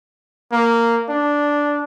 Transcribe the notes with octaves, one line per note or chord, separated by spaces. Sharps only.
A#3
D4